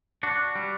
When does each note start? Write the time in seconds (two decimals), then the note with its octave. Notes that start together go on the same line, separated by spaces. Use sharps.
0.23 D4 F#4
0.55 G3